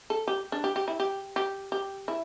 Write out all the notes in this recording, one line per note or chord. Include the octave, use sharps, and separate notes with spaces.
A4
G4
D4
G4
G4
E4
G4
G4
G4
E4